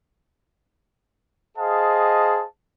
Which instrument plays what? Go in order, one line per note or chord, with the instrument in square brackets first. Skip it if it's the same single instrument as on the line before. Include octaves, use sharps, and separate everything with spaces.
[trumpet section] G#4 C5 D#5 F5 A5